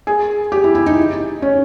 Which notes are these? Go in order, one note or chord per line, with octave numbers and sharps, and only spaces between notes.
G#4
G4
E4
E4
D#4
C#4